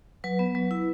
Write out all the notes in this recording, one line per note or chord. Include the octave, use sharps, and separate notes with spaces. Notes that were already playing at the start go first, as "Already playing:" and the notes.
F#3 B4
B3
F#3
E4